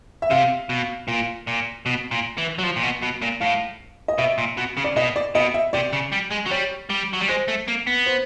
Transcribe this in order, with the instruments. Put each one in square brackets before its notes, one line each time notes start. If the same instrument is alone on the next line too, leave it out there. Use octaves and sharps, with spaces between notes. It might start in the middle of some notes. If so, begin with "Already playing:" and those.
[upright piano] E5
[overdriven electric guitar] C3 [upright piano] F5
[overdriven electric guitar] B2
A#2
A#2
B2
A#2
E3
F#3
F3
A#2
B2
B2
A#2
[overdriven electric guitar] A2 [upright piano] F5
[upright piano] D#5
[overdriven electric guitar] B2 [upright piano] E5
[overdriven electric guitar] A#2
B2
C#3
[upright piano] D5
[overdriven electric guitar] B2 [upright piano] D#5
[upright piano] D5
[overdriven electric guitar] B2 [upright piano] D#5
[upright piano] E5
[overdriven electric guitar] C3 [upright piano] D5
[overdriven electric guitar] C#3
G3
G#3
F#3
[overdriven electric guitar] G3 [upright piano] C#5
[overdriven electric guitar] G3
F#3
G3
[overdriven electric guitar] G#3 [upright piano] C5
[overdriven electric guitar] A3
A#3
B3
[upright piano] C5